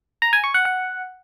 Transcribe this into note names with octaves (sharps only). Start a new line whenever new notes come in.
A#5
G#5
C#6
F#5
F#5